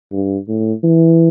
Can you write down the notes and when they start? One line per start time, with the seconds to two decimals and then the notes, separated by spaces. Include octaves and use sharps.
0.12 G2
0.48 A2
0.84 E3